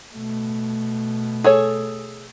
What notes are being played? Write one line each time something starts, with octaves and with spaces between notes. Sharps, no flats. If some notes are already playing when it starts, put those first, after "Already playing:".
B2 A3
G#4 A4 C#5